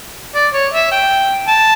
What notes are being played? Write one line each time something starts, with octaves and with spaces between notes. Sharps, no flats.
D5
C#5
E5
G5
A5